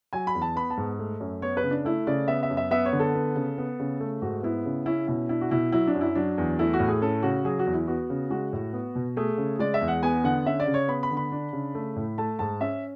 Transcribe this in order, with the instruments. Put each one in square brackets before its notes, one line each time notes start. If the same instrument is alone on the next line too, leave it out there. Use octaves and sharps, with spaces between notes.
[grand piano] F#3 G#5
B5
E2
A5
B3 B5
A5
G#2
A3
F#2
B3 C#5
B4
C#3
D4
A3 E4
C#3 D5
B3 E5
E5
F#2
E5
B3 E5
C#5
D3
A4
B3
C#3
B3
C#3
A3
G#2 F#4
B3 E4
C#3
C#4 E4
B2 E4
D4 E4
F#4
B2 E4
F#3 E4
D4
F#2
E4
F#3 D4
E2
A3 E4
F#4
A2
G#4
C#4 A4
C#3 F#4
F#3 G#4
F#4
E2
E4
B3 F#4
C#3
G#3 F#4
A2
B3
B2
A3 G#4
C#3
G#3 D5
E5
E2
F#5
B3 G#5
D3 F#5
C#4 E5
D5
C#3
C#5
B3 B5
B5
D3
B5
D4
C#3
A3
A2
A3 A5
G#2 A5
C#4 E5